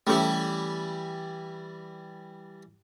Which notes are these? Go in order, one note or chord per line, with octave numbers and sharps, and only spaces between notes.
E3 G3 A3 C#4 G4